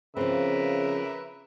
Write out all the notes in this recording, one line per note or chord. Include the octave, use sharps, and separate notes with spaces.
C#3 F3 C4 A#4 B4 E5